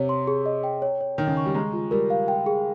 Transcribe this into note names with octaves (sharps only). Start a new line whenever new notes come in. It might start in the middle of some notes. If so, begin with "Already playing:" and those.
Already playing: C3 C#5
C6
G#4
D#5
G5
C#5
C#5
D#3 G5
C#3
C#6
G3
G#3 A#5
F4
G3 A#4
F5
G5
G#4